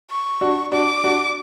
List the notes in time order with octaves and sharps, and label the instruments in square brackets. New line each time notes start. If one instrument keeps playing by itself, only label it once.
[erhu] C#6
[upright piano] D4 F#4
[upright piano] D4 F#4 [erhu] D6
[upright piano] D4 F#4